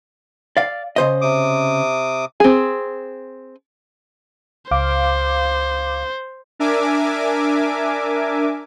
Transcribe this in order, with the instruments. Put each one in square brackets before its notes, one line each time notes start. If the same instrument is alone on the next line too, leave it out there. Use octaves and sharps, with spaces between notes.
[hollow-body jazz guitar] D5 F5
C#3 C5 D#5
[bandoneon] C3 D6 D#6
[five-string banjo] C4 G#4
[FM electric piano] C#2 F5 D6 [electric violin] C5
[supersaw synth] D4 A#4 E5 G#5 D6